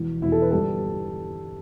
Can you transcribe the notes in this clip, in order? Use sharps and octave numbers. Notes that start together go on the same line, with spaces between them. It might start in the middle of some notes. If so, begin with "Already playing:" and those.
Already playing: E1 E2 B2
E1 E2 B2 E4
A4
B4
G1 G2 G3 A4